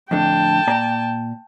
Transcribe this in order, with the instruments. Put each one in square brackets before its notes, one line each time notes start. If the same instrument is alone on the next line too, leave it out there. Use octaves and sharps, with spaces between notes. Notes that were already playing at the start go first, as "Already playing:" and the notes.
[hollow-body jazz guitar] F2 A2 D3 [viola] G5 A5
[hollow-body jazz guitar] A#2 D5 A#5